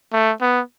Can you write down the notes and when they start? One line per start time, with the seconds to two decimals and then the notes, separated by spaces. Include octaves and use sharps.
0.13 A3
0.41 B3